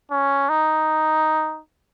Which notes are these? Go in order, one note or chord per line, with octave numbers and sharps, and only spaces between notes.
C#4
D#4